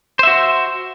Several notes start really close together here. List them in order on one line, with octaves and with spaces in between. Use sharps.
C5 E5 F#4